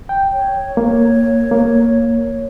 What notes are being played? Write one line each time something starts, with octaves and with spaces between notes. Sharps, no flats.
G5
C#5
A#3
A#3